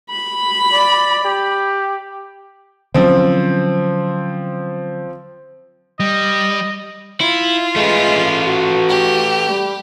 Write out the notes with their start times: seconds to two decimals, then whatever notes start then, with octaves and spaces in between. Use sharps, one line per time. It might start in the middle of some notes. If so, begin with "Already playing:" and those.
0.11 B5
0.73 D5
1.25 G4
2.94 D3 F3 F#3 C4 C#4
6.00 G3 D#5
7.21 E4 F4
7.76 G#3 A3 B4
8.48 F#4
8.89 G4
9.49 G3